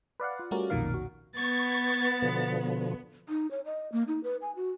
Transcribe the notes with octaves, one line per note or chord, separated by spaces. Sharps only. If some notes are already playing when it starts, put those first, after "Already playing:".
B4 D5 F5 F#5
F4
G3 A3 C#4 F#4 A#4 D5
B1 F2 A#2 D#3 A#4 F5
F#4
B3 C#6 G#6 A6
B2 D3 F3
D#4
C#5
D#5
A#3
D#4
B4
G#5
F#4